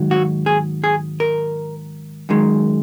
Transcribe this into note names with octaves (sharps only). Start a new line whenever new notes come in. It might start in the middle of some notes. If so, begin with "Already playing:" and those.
Already playing: G#2 D#3 F#3
F#4
G#4
G#4
A#4
F#2 D#3 G#3